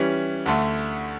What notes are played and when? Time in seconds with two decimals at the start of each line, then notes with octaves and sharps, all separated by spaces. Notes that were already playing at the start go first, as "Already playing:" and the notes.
Already playing: E3 G3 C#4
0.46 D2 D3 A3